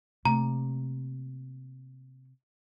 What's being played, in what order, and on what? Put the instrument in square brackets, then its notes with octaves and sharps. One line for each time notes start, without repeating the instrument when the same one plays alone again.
[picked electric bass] C3 [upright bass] A3 A#3 [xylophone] A#5